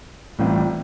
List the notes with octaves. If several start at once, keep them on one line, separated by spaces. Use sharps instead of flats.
A1 A2 G3 C4 F4